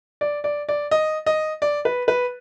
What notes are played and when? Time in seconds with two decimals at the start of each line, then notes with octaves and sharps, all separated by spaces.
0.21 D5
0.44 D5
0.69 D5
0.91 D#5
1.26 D#5
1.62 D5
1.85 B4
2.08 B4